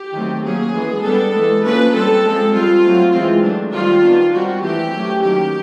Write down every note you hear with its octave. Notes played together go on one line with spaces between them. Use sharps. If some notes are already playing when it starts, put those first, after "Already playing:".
Already playing: G4
D#3 F#3 A3 C4
F#3 A#3 C#4 G#4
E3 G#3 B3
G3 B3 D4 A4
E3 G#3 B3
F3 A#3 C#4 B4
G3 C4 A4
F3 G#3 C4
G3 C4 F4
F#3 A3 C4
E3 G#3 C4 F4
F#3 A3 D4
D#3 G3 C4 F4
D#3 G3 B3 D4
D#3 G3 C4 F#4
E3 A3 C4 G4
F#3 A3 C#4
D#3 F#3 A#3 C#4 G4